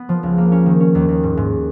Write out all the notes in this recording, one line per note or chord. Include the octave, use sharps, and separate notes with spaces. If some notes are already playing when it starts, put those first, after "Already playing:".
Already playing: B3
F3
C#2
A#3
C#4
D#3
C#4
D#2
D#2
G#2
G#2